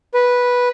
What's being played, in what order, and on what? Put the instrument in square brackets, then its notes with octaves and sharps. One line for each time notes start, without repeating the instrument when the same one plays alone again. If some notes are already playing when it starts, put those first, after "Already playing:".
[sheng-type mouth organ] B4